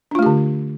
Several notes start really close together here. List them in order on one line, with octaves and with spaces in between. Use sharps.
D4 F4 A3 G4 D3